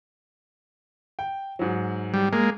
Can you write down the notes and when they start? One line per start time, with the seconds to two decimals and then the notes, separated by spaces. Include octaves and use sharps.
1.19 G5
1.59 G#2 F#3
2.14 G3
2.33 G#3 A#3